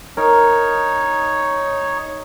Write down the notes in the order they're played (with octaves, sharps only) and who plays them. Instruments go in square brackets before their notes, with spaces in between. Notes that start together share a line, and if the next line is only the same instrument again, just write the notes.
[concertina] D#4 C#5 [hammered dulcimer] A#4